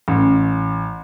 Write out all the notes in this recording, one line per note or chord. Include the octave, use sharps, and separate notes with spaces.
A1